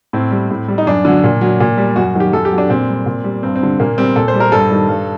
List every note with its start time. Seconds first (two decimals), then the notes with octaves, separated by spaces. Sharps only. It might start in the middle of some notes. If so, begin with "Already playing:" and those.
0.13 A2 C4
0.31 G3
0.50 A2
0.68 G3
0.78 D#4
0.87 F#2 D4
1.05 D3 F#3
1.24 A#2
1.41 F#3
1.60 A#2
1.78 G3
1.96 F#2 F#4
2.15 D#3 F#3 G4
2.33 F#2 A4
2.45 G4
2.52 F#3
2.58 D4
2.70 A#2 C4
2.88 G3
3.06 A#2
3.24 G3
3.43 G2 C4
3.56 C4
3.61 D3 G3
3.80 A#2 A#3
3.98 G3 C4
4.16 A#2 A4
4.28 C5
4.34 G3
4.40 A#4
4.52 G2 A4
4.70 D#3 G3
4.89 G2